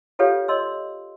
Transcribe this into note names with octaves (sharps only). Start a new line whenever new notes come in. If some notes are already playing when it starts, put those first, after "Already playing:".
F4 G4 A4 B4 C#5 F5
C#5 D#5 C6 E6